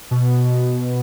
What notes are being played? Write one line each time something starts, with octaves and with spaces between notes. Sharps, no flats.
B2